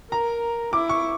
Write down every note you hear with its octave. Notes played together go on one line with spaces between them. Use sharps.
A#4 A#5
E4 D6
C#6